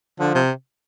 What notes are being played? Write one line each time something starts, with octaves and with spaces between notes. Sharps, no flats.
D3 F3
C3